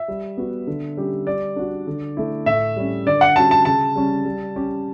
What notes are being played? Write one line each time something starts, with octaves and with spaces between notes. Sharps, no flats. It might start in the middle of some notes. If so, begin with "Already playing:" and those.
Already playing: E5
G3
B3 F#4
D3
G3 C#4 G4
G3 D5
D4 F#4
D3
A3 E4
A2 E5
G3 C#4
D3 D5
F#5
G3 C#4 F#4 A5
A5
C#3 A5
G3 C#4
G3
C#4 G4